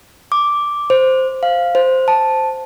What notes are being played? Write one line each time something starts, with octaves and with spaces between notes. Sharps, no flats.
D6
C5
F5
C5
A5